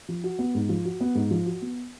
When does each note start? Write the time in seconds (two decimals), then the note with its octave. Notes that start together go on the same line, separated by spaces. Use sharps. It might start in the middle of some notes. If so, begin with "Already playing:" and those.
0.08 F3
0.24 F#4
0.39 B3
0.55 G#2
0.69 F3
0.85 F#4
1.00 B3
1.15 G#2
1.31 F3
1.46 F#4
1.62 B3